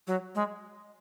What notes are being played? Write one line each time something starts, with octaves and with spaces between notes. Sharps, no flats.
F#3
G#3